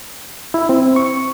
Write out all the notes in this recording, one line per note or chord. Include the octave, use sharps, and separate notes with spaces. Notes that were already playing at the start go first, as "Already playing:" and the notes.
E4
C4
C#6